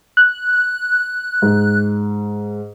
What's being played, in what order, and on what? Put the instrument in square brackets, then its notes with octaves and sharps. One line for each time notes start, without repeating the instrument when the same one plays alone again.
[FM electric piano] F#6
[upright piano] G#2